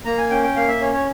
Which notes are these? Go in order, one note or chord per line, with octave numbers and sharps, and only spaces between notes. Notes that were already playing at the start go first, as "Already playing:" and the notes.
A#3 A#5
G#5
C#4 G5
G5
A#3 F5
E5
C#4 C#5
C#5